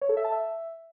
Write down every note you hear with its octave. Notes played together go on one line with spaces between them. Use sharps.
C#5
A4
E5
A5
E5